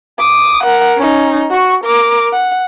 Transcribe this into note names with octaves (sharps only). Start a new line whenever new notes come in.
D6 D#6
A#4 F#5
C#4 D#4
F#4 C#6
A#4 D6
F#5